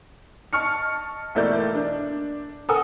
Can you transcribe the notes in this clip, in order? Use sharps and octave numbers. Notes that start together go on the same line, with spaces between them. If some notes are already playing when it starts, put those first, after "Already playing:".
D#5 A5 C#6 F6 C#7
B1 E3 A3 A#3 D5 G6
D4
A4 A#4 F#5 G#5 D#6